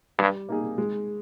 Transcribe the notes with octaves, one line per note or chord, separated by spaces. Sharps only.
G2 G3
A#3 D#4 G#4
G#3